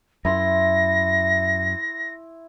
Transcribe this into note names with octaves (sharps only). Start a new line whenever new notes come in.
F#2 E4 C6 A#6